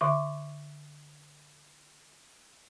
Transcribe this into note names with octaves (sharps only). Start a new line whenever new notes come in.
D3 E5 C#6 D6